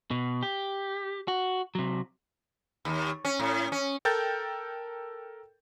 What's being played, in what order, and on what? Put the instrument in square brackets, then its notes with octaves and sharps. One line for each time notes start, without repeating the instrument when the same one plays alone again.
[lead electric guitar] B2
G4
F#4
C3 F#3
[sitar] D#2
C#4
A2
C#4
[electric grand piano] A4 A#4 G5 G6 A6